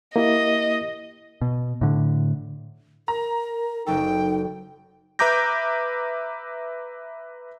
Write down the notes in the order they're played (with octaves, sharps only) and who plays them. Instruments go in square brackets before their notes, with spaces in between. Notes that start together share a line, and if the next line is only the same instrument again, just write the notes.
[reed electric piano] A#3 E4 G4 [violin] D#5
[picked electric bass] B2
A2 D3
[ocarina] A#4 [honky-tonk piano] A#5
[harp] F#1 F#3 A4 [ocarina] D#4 [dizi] G5
[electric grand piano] B4 E5 A#5 D6 G6 A#6